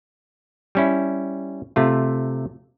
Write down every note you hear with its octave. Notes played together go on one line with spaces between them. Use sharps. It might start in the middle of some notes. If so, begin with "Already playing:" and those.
G3 C#4 E4
C3 A3 F4